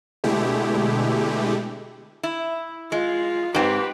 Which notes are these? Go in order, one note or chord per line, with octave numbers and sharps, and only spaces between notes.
B2 D3 G#3 A3 E4 G4
E4
G#3 F4
G#2 C4 G4 B4